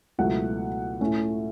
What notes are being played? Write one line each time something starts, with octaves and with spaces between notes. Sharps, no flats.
C#2 B2 F#3 A3 E4 F#5
A2 A3 C#4